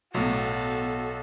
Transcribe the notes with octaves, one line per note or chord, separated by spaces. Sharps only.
B1 A2 F#3 B3 F#4 A4